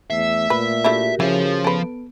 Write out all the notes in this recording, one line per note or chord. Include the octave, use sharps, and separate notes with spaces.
E2 A3 E5 E6
A#2 B4
A3 D4 E4 F#4 G4 A#4
C#3 E3 F3
B3 A4 B4